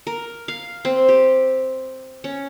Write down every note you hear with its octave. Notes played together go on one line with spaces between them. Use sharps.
A#4
F5
C4
G4
C#4